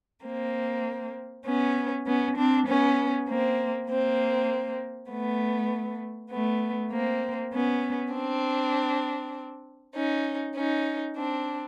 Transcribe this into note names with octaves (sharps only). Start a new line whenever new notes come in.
A#3 C4
B3 C#4
B3 C#4
C4 D4
B3 C#4
A#3 C4
A#3 C4
A3 B3
A3 B3
A#3 C4
B3 C#4
C4 D4
C#4 D#4
C#4 D#4
C4 D4